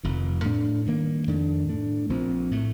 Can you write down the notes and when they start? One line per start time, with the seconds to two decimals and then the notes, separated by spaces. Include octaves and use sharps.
0.03 F1 F2 D#3
0.44 A2 A3 D4
0.86 G2 D#3 A#3
1.27 F2 D#3 A3 D4
1.68 A2 A3 D4
2.09 A#1 A#2 F3 C4
2.51 A2 A3